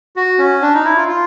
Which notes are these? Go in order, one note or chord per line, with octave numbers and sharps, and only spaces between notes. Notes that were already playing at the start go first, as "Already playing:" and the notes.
F#4
C#4
D4
D#4
E4
F4
F4